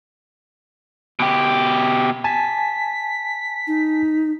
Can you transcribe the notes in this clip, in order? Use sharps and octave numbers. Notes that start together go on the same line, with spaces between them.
B2 G4
G#5 A5 B6
D#4